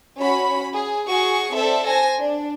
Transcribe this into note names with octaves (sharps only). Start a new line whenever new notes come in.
C#4 F#4 B5
G#4
F#4 G#4 C#6
C4 A4 C5 D5 E5
C5 G#5 A#6
D4